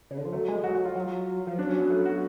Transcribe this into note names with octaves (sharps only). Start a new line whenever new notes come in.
C#3
D3
F3
F#3 A3
G#3
F#3 F#4
F#4
F4
F#3
F3
F#3 D4
C#4
B3
A3
F#4